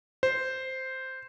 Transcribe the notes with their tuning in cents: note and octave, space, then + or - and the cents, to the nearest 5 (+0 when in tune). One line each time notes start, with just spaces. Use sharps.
C5 -5